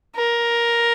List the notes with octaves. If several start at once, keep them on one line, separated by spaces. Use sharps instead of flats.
A#4